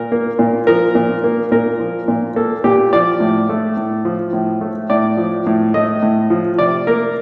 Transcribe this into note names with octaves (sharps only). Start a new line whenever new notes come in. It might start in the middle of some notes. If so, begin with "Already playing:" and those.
Already playing: A#2 A#4
A#3
A#2
F3 A#4
A#2
A#3
A#2 A#4
F3
A#2
A#3 A4
A#2 G4
F3 D5
A2
A3
A2
F3
A2
A3
A2 D5
F3
A2
A3 D#5
A2
F3
C3 D5
A#3 A#4